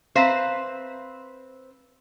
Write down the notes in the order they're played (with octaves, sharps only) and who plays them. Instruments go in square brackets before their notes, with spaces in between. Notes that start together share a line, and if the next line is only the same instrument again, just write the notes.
[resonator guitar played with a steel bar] C4 B4 C5 [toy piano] E5 F5 A#5